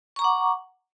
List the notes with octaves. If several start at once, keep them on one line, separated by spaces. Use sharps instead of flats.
F#5 A#5 C#6 D6